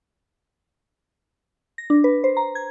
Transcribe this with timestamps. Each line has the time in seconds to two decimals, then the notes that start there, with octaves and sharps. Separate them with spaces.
1.78 A#6
1.90 D4
2.04 B4
2.24 C5
2.37 A#5
2.55 G#6